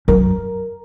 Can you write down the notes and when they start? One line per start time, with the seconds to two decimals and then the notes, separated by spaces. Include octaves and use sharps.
0.08 F#2 A#4